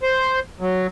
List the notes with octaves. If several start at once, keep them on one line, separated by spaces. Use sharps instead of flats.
C5
F#3